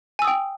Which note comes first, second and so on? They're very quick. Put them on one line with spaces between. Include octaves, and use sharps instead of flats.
G#5 E6 D#6 G5